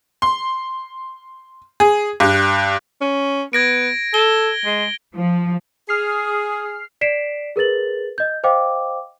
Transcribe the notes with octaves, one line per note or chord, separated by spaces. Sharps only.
C6
G#4
G2
C#4
B3 G#6 A#6 D7
A4 G7
G#3
F3
G#4 F6 C7
D5 B6 C7 D7 E7
G#4 A#4 B4 A6 F#7
D#5 G6
C5 D#5 F5 G5 D6